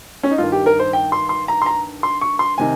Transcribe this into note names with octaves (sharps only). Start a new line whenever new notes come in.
C#4
D#4
G2 D#3 F4
G4
A#4
C5
G5
C6
C6
A#5
C6
A#5
C6
C#6
C6
C3 D#3 G#5